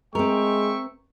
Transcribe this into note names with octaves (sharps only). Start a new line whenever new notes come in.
G#3 C4 A#4 E5 G5 C#6